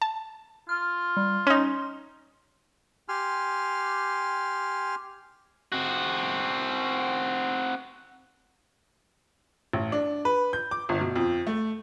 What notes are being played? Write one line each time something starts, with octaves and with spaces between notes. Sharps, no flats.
A5
F4 F6
G3
C#4 D#4 C6
G4 G#5 C6 F6
C4 F#4
A1
D4
B4
G6
D6
G1
B2
F2
A3